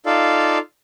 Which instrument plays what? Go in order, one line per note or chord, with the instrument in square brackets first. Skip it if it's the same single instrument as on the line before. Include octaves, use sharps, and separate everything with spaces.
[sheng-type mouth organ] D#4 F4 A4 D5 F5